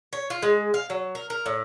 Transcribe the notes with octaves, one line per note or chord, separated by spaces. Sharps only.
C#5
F4
G#3
F5
F#3
A#4
A#4
A2